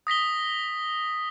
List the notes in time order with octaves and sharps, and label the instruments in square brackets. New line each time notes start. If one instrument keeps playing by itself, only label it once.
[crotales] D#6 A#6 B6 G7